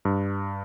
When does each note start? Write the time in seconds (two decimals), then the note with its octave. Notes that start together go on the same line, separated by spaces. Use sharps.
0.05 G2